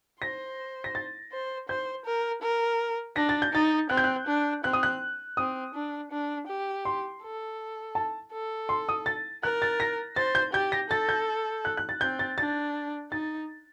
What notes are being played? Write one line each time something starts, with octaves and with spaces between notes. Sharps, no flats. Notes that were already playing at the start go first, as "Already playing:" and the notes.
C5 A#6
A#6
A6
C5
C5 G6
A#4
A#4
D4 A#6
A6
G6
D#4 A6
C4 F#6
G6
F#6
D4
C4 F#6
D#6
F#6
C4 D#6
D4
D4
G4
C6
A4
A5
A4
C6
D#6
A6
A#4 F#6
A6
A#6
C5 A6
G6
G4 G6
A#6
A4 A6
G6
F#6
F#6
A6
C4 G6
A6
D4 A6
D#4 A6